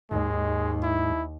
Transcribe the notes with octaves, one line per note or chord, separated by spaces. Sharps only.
D#2 G#2 G#3
E4